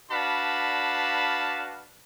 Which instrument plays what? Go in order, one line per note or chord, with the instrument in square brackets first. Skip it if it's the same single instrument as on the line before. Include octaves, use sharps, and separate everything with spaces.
[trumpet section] D4 F#4 B4 F5 A5 B5